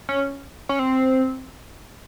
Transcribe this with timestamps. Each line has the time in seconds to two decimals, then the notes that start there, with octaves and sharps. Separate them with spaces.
0.09 C#4
0.69 C#4
0.79 C4